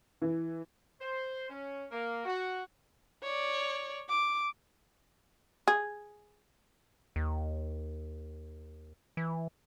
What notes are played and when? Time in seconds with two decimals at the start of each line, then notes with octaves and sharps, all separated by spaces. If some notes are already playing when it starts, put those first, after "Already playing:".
0.22 E3
1.01 C5
1.50 C#4
1.91 A#3
2.26 F#4
3.23 C#5 D5
4.09 D6
5.68 G#4
7.16 D#2
9.17 E3